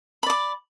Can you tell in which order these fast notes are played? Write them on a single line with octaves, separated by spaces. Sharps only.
B5 D5 D6